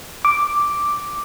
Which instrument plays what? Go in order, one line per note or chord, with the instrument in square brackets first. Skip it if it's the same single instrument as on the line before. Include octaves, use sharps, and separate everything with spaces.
[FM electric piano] D6